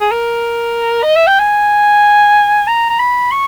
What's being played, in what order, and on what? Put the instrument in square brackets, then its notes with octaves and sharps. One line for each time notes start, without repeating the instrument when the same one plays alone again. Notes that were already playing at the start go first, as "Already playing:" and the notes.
[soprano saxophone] G#4
A#4
D#5
E5
G5
G#5
A#5
A#5
B5
C#6